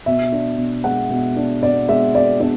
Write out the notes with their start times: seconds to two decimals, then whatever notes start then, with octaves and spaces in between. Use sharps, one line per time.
0.06 B2 E5
0.32 D4
0.58 B2
0.84 G#3 F#5
1.10 B2
1.36 D4
1.63 B2 D5
1.88 G#3 E5
2.15 B2 D5
2.40 D4 D5